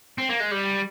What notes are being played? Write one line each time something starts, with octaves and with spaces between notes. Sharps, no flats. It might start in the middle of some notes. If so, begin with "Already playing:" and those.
C4
A#3
G#3
G3